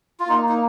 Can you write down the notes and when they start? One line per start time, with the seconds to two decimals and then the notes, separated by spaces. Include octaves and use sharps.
0.20 F4
0.28 A#3 D#4
0.49 D#4